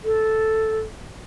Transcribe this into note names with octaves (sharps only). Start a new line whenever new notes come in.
A4